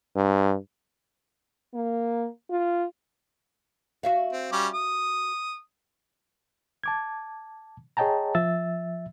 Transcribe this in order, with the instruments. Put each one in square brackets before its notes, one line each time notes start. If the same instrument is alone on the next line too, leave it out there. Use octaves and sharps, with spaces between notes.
[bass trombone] G2
[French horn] A#3
F4
[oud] F#4 E5 F5
[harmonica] C4
G3 C#4 D6
D#6
[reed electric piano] A5 D6 G#6
G#4 C#5 D#5 G5 A5 A#5
F3 E5 E6 A6